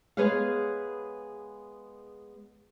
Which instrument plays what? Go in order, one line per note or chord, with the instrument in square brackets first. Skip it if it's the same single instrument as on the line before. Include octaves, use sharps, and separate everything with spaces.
[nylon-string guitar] G#3 B3 G#4 B4 C#5 F5